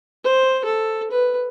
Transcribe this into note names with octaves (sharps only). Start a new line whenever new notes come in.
C5
A4
B4